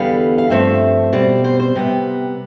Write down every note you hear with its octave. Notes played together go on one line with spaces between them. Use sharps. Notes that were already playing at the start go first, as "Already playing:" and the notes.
Already playing: E2 D3 G3 B3 F5
F5
G2 F3 A3 C4 E5
B2 G3 C4 D5
C5
C5
C3 G3 B3